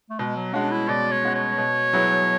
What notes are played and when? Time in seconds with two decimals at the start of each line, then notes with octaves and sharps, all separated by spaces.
0.10 A3
0.19 B2 G#3
0.36 F#3
0.53 G#3 C#4 D4 F#4
0.72 E4
0.88 B2 D5
1.12 C#5
1.24 G#3 C#4 F#4
1.35 C#5
1.58 B2
1.93 F#3 B3 E4 G#4